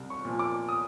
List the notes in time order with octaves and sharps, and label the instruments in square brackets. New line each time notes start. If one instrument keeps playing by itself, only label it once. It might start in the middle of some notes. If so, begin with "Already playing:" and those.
Already playing: [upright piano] C2
C#6
A#2 F3
D6
D#6